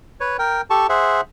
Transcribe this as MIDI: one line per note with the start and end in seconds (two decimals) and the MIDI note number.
0.20 0.37 71
0.20 0.37 73
0.39 0.62 70
0.39 0.62 79
0.70 0.87 67
0.70 0.87 69
0.70 0.87 81
0.70 0.87 85
0.89 1.21 68
0.89 1.21 72
0.89 1.21 76
0.89 1.21 78